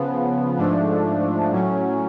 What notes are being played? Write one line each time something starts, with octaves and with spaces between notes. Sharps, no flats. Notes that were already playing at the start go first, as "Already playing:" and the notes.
Already playing: C#3 F3 B3
G#2 F3 A3 D4
A2 F#3 C#4